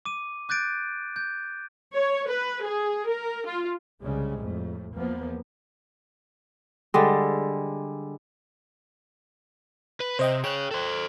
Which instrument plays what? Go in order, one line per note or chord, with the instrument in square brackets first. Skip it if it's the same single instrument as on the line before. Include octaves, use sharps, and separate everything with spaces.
[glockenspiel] D6 D#7
D6 F#6 G6 A6 D7
G6
[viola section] C#5
B4
G#4
A#4
F4
[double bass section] C2 C#3 G3 G#3
F2 A2
E2 F3 A#3 B3
[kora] D3 G3 G#3
[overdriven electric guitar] B4 B5
[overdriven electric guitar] C3 [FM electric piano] C5 D#5 G5
[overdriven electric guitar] G#4 C#5 [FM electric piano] G5 F#6
[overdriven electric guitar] A4 C5